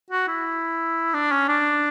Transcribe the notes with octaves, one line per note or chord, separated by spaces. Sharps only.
F#4
E4
D4
C#4
D4